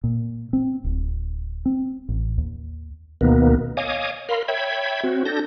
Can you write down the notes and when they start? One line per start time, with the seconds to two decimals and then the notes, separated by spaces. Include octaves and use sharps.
0.04 A#2
0.53 C4
0.84 D1
1.66 C4
2.09 A1
2.38 D#2
3.21 D2 B2 D#3 A#3 B3
3.77 C#5 D#5 F5 G#5 D6 D#6
4.29 A#4 F5 B5 C6
4.48 C#5 E5 G5 B5 G#6
5.04 C4 F#4
5.25 D4 A4 G6 A#6